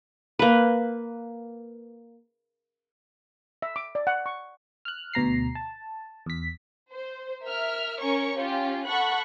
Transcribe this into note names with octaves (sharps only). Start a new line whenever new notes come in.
A#3 B4
E5
D6
D5
F#5
C#6
F6 F#6
D2 B2 A#5 C7
A5
E2 B6
C5
A#4 E5 F6
C#4 A#4 C#5 C#6
C#4 F4 G4
A4 F#5 B5 C#6 F#6